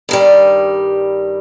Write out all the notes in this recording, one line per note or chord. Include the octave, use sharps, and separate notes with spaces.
G2 D#3 G3